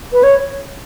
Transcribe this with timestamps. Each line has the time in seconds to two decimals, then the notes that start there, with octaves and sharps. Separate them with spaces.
0.13 B4
0.23 C#5